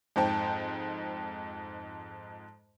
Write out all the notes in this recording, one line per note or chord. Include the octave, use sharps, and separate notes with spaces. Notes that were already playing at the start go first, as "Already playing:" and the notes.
F2 G#2 C5 G5 A5